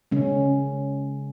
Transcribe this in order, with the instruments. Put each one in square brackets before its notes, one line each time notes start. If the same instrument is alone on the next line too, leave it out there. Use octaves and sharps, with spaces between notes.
[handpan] C#3 G#3 C#4